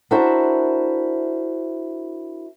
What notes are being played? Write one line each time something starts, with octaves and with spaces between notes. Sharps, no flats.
D4 E4 F#4 A#4 C5 E5